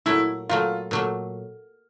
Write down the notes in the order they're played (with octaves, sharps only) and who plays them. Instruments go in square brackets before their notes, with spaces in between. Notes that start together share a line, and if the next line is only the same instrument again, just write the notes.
[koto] A#2 F#3 A3 [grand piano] E4
[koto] A#2 F#3 A3 [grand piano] F4
[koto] A#2 F#3 A3